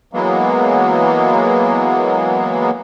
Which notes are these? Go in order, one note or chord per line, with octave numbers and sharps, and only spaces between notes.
E3 F#3 G#3 A#3 B3